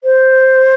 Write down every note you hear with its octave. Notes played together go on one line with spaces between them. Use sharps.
C5